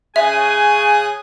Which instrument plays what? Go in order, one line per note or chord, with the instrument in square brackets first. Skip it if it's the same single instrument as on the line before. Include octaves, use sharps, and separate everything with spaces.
[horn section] C#3 G#5 [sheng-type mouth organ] G#4 D#6 F#6 [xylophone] E5